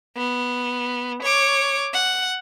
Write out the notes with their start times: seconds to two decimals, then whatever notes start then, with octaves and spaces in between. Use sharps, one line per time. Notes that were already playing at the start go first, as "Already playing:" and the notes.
0.16 B3
1.23 C#5 D6
1.94 F#5